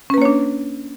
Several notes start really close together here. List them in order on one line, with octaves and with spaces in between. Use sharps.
C#4 B4 A#3 C#5 D4